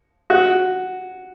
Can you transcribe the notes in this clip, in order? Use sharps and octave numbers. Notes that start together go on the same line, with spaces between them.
F#4